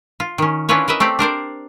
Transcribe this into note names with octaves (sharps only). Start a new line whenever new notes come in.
F4
D#3 C#4
C#4 D4 E4 F4 B4 C#5
A#4 B4 D#5 E5
A3 C4 G4 D5
D4 A#4 C5 D5